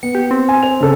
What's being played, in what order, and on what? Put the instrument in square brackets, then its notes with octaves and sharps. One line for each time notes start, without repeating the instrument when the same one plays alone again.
[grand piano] B3 [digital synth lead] C#7
[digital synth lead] G4
C4
[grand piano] G#5
C5 F7
C#3 A4